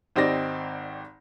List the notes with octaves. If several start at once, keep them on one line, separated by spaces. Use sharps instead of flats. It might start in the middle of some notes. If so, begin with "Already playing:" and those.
G#1 C4 D#4 G4 D5 A#6